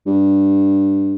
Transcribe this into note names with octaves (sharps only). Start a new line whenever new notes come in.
G2